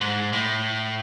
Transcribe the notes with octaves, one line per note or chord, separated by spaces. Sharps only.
G#2
A2